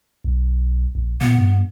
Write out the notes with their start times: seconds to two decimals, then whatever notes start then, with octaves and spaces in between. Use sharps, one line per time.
0.24 B1
0.95 A#1
1.21 A#2 B3
1.38 G2